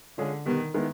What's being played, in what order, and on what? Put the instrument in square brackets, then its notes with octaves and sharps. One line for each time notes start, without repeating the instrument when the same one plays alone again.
[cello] D3 [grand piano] G#3 C#4 F4 G#4
[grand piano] B2 G3 B3 [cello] D#3
[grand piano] D#3 G#3 B3 E4